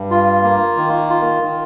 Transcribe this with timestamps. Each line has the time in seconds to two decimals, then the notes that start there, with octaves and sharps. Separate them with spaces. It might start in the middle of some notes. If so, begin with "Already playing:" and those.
Already playing: G2
0.11 F4
0.43 A#3
0.77 D#3
1.10 F4
1.42 D#3